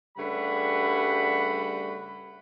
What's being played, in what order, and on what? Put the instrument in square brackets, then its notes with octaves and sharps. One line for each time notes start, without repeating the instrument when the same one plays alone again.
[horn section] G2 C#3 G3 A3 F#5 B5